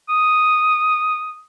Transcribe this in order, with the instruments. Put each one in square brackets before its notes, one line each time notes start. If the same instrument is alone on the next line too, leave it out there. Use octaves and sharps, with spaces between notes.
[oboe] D#6